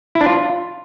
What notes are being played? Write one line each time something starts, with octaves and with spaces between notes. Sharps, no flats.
E4
D4
F4